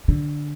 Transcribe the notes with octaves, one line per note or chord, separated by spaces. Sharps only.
D3